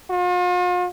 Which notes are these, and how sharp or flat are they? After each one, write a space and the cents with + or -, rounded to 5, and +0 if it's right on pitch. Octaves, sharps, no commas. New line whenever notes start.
F4 +40